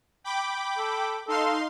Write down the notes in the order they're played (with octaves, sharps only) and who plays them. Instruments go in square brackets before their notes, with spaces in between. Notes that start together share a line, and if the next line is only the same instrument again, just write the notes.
[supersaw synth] G5 B5 D6
[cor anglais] A4
[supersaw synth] D#4 F5 C6 [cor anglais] A4